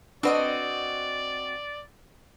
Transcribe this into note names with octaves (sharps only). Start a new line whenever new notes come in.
C4 D4 F#4 B4 D5 D#5